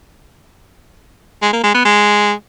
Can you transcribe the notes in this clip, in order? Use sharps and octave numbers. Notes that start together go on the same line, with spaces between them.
G#3
A#3
G#3
B3
G#3